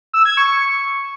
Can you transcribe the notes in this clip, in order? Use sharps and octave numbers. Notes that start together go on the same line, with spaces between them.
E6
G#6
C#6